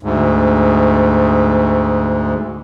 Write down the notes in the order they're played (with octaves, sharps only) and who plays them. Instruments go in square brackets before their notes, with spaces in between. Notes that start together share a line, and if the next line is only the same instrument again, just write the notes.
[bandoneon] D2 G#2